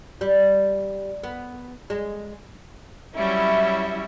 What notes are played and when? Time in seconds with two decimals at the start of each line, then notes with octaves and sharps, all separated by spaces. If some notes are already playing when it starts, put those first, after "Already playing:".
0.21 G3
1.23 B3
1.90 G#3
3.15 F#3 G3 C#4 E4 E5